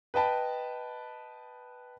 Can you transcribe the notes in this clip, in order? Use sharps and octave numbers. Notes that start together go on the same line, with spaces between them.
B4 D#5 G5 A5 B5